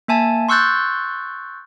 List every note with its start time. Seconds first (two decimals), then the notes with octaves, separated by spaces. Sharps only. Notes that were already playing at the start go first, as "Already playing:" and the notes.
0.08 A#3 E5 G#5 A5
0.49 C6 C#6 E6 F#6 G6 A6